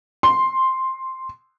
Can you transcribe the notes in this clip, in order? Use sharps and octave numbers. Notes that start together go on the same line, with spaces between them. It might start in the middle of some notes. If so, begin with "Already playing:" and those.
C6